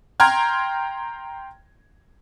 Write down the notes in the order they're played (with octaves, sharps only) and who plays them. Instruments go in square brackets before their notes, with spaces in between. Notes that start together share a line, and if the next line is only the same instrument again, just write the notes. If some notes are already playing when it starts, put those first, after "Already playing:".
[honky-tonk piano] G5 A#5 C6 F6 G#6